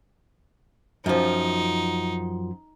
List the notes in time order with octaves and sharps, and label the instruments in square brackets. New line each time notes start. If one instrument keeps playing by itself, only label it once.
[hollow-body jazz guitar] F#2 F3 [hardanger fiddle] D#4